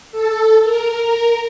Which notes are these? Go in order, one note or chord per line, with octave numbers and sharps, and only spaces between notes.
A4
A#4